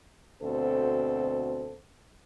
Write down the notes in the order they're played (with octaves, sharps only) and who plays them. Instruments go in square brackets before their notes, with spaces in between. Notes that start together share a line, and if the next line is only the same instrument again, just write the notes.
[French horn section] D2 B2 C4 A4 C5